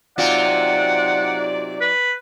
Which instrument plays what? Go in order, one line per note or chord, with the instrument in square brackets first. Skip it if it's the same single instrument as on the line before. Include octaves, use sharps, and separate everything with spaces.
[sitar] C3 C4 F4 [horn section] F#3 D#4 D5 [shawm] F#5
[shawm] B4